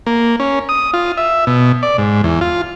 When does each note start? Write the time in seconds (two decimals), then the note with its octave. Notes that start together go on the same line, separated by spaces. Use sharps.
0.07 A#3
0.40 C#4
0.69 D#6
0.94 F4
1.17 E5
1.47 B2
1.83 D5
1.98 G#2
2.24 E2
2.41 F4